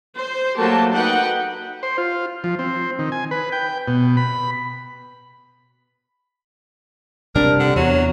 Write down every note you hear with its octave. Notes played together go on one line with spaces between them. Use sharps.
C5
F#3 A3 A#3 F#4 G4 A5
D#4 B4 F#5 G5
C5
F4
F3
C4
D#3
G#5
B4
G5
B2
B5
C3 G3 D4 A#4
D3
E2 F#3